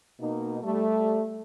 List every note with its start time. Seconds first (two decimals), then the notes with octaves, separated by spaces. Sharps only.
0.20 B2 A#3 D#4
0.62 G3 A3